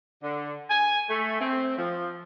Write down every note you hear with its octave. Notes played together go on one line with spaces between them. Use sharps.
D3
G#5
A3
C4
F3